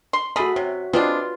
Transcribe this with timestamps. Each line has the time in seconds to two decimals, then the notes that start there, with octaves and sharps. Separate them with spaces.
0.13 C6
0.36 A3 F#4 G#4 E5 B5
0.56 C3 C#5
0.93 G#3 C4 D4 F4 B4